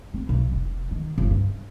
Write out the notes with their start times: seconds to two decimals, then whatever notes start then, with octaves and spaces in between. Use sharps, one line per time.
0.14 C4
0.29 B1
0.52 F1
0.91 D#3
1.18 G1
1.31 G2